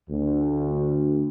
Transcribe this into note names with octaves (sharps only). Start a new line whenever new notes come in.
D2